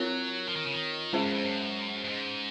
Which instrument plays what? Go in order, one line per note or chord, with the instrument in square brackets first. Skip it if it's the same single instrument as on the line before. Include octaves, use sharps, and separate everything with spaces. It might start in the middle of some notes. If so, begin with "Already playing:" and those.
Already playing: [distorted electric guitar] F#3 [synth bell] C4 F4 A#4 C#5
[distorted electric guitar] F3
D#3
C#3
D#3
[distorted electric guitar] C#3 [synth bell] G#3 C#4 G#4 C5
[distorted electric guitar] F#2
F2
F#2
F#2
G#2